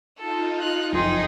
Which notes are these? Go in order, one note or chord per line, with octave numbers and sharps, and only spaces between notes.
D#4 F4 A4
F6 F#6
F#1 F2 D#4 G#4 G5 C6